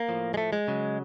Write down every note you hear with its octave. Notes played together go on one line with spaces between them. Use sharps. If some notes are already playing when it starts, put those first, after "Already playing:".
Already playing: A#3
A2 F3
G#3
A3
G#3
C#3 F#3